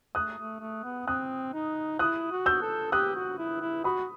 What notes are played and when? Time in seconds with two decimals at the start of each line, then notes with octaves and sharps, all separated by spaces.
0.15 A3 D#6 F#6
0.38 A3
0.61 A3
0.84 B3
1.07 C4 D#6 F#6
1.54 D#4
1.99 E4 D#6 F#6
2.31 F#4
2.46 E6 G6
2.62 A4
2.92 G4 D#6 F#6
3.15 F#4
3.38 E4
3.61 E4
3.84 F#4 B5 D#6